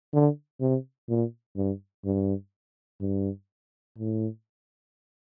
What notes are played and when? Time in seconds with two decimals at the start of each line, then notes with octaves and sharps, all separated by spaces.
0.13 D3
0.61 C3
1.09 A#2
1.57 G2
2.05 G2
3.01 G2
3.98 A2